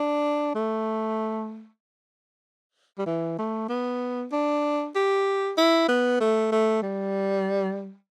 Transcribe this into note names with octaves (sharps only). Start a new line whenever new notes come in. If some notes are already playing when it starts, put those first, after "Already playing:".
Already playing: D4
A3
G3
E3
A3
B3
D4
G4
E4
B3
A3
A3
G3